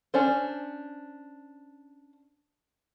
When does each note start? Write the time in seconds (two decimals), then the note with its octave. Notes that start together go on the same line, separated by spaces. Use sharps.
0.14 C#4 D4 C5